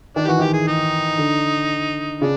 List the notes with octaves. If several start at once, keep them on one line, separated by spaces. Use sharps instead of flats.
D#3 D4
E3 F#4 G4
D#3 G4
G#4
D#4
D3
C#3 D4